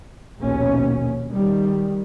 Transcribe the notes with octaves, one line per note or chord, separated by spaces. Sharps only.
A#1 D#2 B2 C#4
D#3 G3